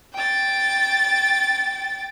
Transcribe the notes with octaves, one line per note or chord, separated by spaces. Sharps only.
G5 A6